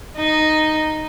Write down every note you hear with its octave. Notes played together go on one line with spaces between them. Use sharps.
D#4